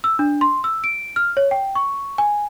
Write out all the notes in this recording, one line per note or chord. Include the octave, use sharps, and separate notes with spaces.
E6
D4
C6
E6
D7
F6
C#5
G5
C#6
G#5